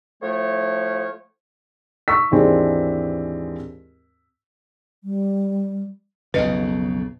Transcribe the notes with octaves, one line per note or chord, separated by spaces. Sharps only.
A2 F3 A3 C#5
C#6 E6 B6
D#2 G#2 E3 G#3 C4 D4
G3
B1 F2 C#3 B4 D#5